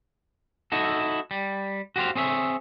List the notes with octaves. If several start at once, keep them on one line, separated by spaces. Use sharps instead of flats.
D#4 E4 F#4 A4
G3
F#4 G4 B4 C5 F5
C4 G#4 C#5 E5